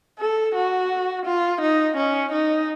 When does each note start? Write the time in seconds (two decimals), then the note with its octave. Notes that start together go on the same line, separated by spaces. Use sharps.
0.19 A4
0.55 F#4
1.26 F4
1.62 D#4
1.97 C#4
2.33 D#4